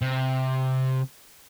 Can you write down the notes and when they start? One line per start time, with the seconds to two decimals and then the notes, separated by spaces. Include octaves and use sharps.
0.02 C3